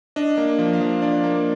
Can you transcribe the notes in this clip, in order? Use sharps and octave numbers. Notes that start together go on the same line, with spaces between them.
D4 D#5
A#3
F3
F5
F3
D4 D5
A#3